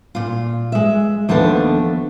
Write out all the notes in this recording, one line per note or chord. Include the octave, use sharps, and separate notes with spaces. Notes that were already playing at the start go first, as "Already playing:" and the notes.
A#2 F4
G#3 E5
D#2 F3 A3 B3 D4